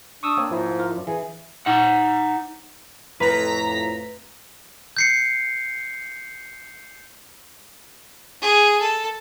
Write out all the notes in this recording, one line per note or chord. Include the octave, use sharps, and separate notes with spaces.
D4 C#6 D#6 E6
A#3 C4 C#5
G#2 F3 E4
F4 A#4
F#2 D4
E3 G#4
D#4 F#5
F2 A2 B4 A#5 B6
G6 C7 C#7
G#4
A4